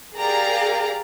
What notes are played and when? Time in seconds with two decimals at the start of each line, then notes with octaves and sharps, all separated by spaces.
0.16 G4 G#4 A#4 D5 F5 A#5